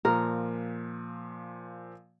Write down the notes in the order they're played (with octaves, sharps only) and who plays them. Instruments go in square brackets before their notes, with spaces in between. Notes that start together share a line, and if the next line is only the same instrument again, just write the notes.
[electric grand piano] A#2 F3 [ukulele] A#4